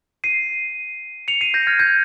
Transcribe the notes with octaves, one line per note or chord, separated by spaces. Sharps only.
C7 D#7
C#7 F7
C7 D#7
G6 A#6
F6 G#6
G6